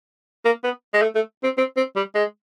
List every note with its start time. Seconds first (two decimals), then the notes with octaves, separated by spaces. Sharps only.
0.45 A#3
0.64 B3
0.94 G#3
1.02 A3
1.15 A3
1.44 C4
1.58 C4
1.77 C4
1.96 G3
2.15 G#3